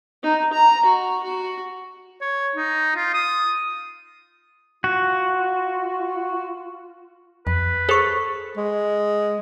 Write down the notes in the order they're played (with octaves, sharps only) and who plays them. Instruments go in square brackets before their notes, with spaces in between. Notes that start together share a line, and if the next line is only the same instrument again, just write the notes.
[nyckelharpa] D#4
A#5
F#4
F#4
[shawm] C#5
D#4
F4
D#6
[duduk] F4 [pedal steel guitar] F#4
[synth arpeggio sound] F2 [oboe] B4
[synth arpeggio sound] G#4 C7 C#7 [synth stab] A4 [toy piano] C5 C#6
[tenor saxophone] G#3